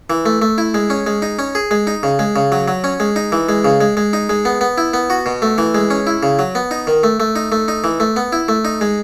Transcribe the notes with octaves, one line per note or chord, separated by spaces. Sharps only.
E3
A3
A3
E4
G#3
C#4
G#3
D#4
C#4
G#4
G#3
D#4
C#3
G#3
C#3
F#3
F#3
C#4
G#3
D#4
E3
G#3
C#3
G#3
G#3
D#4
G#3
B3
B3
E4
B3
F#4
B2
A3
E3
G#3
C#4
E4
C#3
F#3
B3
D#4
D#3
A3
A3
D#4
A3
D#4
E3
A3
B3
E4
A3
D#4
G#3